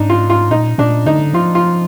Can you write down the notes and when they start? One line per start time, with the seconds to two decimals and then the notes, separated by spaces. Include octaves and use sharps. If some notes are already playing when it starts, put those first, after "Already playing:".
Already playing: G#2 D4 D#4
0.10 F4
0.30 F4
0.50 A#2 D#4
0.78 A#2 D4
1.06 D3 D#4
1.34 F3 F4
1.55 F4